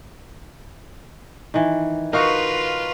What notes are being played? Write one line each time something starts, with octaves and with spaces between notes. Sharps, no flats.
D#3 E3
D#4 F4 F#4 A#4 B4 F5 C#6